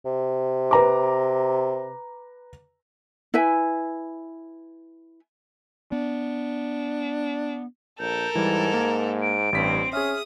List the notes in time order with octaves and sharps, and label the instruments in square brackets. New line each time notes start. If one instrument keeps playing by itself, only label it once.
[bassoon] C3
[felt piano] B4 A#5 D6
[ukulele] E4 B4 E5 G#5
[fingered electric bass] B3 [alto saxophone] D4
[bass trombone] A#1 [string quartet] A4 A#4 [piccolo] G6
[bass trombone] G#2 [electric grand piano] E3 G3 [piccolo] G#6
[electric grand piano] A#3
[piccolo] D7
[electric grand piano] A1 B6 [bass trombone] G2 [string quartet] C4
[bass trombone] C#4 [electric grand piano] G#4 E5 [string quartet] D#6 [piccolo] F6